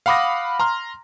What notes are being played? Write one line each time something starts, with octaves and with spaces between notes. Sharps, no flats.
F5 F#5 B5 D6 D#6 A#6
A#5 C6 F6